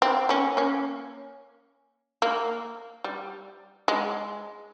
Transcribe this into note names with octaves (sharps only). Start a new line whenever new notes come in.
C4
A#3 C#4
A#3 C#4
A#3
G3
G#3